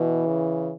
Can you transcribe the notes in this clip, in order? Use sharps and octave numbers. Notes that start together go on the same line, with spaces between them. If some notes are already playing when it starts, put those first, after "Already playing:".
Already playing: B2 E3
C#3